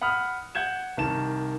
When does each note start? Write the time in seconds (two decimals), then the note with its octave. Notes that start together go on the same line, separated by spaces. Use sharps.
0.01 F#5 B5 D#6 F6
0.55 F#5 G6 G#6 E7
0.97 C2 D#3 A5 E7